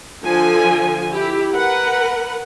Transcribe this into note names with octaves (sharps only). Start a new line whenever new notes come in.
D3 F3 G#5
E4 G4
A#4 B4 F#5